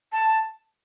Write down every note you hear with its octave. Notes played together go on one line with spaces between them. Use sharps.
A5